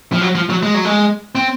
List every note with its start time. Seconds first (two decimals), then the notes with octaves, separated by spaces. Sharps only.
0.13 F3
0.21 F#3
0.35 F3
0.50 F#3
0.63 G#3
0.74 F#3
0.85 G#3
1.35 C4